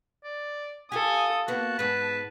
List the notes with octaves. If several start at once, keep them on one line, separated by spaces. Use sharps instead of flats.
D5
F4 G4 A4 G#5 D#6
A#3 B3 F#4 A5
G#2 B3 B4